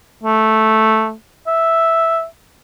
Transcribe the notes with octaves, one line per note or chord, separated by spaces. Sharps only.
A3
E5